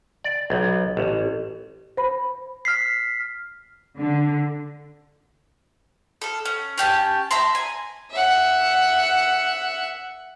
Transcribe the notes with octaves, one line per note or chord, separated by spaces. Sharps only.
D5
B1
A1
C5 B5
F6 B6 C7
D3
A4 F5
C#4
C#4 G4 A5
E5 A5 A#5 C6
G#5
E5 F#5